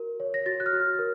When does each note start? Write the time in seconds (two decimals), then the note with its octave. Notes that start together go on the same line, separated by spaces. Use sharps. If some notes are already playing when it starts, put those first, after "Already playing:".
Already playing: F#4 A#4
0.20 C#5
0.34 A#6
0.46 F#4 A6
0.60 F#6
0.66 F6
0.73 F#4
0.99 A#4